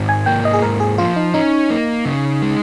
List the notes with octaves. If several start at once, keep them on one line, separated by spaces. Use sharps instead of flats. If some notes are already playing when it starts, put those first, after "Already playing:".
Already playing: G#2 D#3
G#5
A#3 G5
D#5
G#4
G#2 A#4
G#4
F3 F4
D#4
C#4 D#4
A#3
C#3
G#3